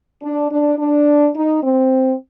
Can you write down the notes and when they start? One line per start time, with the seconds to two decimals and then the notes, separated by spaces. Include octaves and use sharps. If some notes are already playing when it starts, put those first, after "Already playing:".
0.22 D4
0.51 D4
0.78 D4
1.35 D#4
1.63 C4